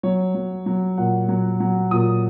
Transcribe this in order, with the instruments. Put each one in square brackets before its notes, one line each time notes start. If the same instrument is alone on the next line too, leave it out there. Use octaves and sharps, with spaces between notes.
[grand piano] F#3 C#5
F#3
F#3
A#2 F#5
F#3
F#3
A#2 D#6